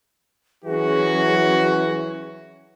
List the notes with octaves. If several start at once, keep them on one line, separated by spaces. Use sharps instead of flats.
E3 F#3 C#4 F#4 G#4